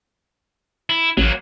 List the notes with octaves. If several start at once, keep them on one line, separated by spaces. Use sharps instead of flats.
E4
A1 F#3 A#3